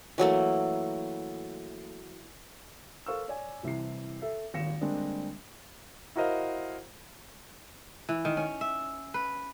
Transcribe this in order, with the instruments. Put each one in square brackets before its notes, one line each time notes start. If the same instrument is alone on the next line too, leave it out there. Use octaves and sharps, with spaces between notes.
[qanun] E3 F#3 A3 A#3
[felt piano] A4 A#4 C5 F5 C#6 E6
C#5 D5 G#5
C2 C3 E3 C7
A4 E5
D#1 G#1 A#6 C#7 E7
D3 G3 G#3 A#3 C4 D4
[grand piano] E4 F#4 A#4 C5 D#5 F5
[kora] E3
D#3
C#4
E5
B4